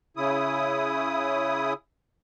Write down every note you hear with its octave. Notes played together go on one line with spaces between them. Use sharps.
C#3 E4 D#6